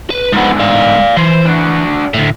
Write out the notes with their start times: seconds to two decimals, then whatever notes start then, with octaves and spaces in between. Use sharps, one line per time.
0.11 B4
0.32 G#2 D3 F3 B3
0.59 D5 F5
1.17 E3 C5
1.45 D4 F#4
2.14 D2 A2